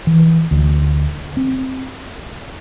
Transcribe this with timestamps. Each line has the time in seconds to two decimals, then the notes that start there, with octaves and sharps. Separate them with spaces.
0.07 E3
0.51 D2
1.37 C4